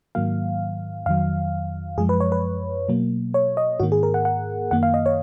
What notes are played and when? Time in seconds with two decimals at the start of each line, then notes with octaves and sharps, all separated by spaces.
0.15 G#2 D#3 F#3 A#3 F5
1.06 F2 D#3 F#3 F5
1.97 F#2 F3 G#3 G#4
2.09 B4
2.20 C#5
2.32 B4
2.88 B2 F#3 A#3
3.34 C#5
3.57 D#5
3.80 G#2 D#3 A#3 F#4
3.92 G#4
4.03 A#4
4.14 F#5
4.25 F#5
4.71 F#2 D#3 A#3 F#5
4.83 F5
4.94 D#5
5.06 C#5